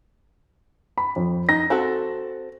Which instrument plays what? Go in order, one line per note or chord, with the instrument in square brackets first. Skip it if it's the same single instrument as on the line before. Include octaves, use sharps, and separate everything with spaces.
[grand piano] B5
F2
[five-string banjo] D#4 [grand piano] A#6
[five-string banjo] C4 F#4 A4